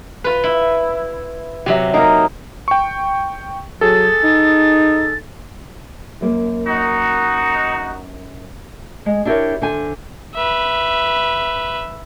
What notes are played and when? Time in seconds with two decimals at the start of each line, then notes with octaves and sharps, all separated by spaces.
0.24 F4 B4
0.44 E4
1.66 C3 F#3 G4 E5
1.94 A#3 D#4 A#4
2.68 G5 C#6
3.81 F#3 G#4 A4 A6
4.23 D#4
6.21 F#2 A#3
6.67 D#4 F#4
9.06 G#3
9.25 D4 E4 G4 A4 A#4 C#5
9.61 D3 C5 G#5
10.35 B4 E5